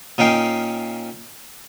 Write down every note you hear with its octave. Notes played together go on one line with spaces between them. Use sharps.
A#2 C#4 D#4 F5 G5